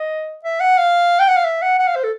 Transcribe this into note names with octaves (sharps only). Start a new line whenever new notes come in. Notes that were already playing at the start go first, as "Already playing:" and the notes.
Already playing: D#5
E5
F#5
F5
G5
F#5
F5
E5
F#5
F#5
F5
C5
A4